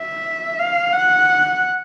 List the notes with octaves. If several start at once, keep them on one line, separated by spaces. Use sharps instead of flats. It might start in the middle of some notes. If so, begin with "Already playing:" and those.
Already playing: E5
F5
F#5